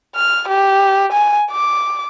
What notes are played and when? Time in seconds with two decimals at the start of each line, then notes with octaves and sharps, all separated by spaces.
0.15 F6
0.48 G4
1.13 G#5
1.51 D6